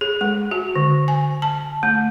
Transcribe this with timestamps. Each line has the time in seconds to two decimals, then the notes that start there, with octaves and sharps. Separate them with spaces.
0.01 G#4
0.21 G#3
0.51 F#4
0.76 D3
1.08 G#5
1.42 A5
1.83 A3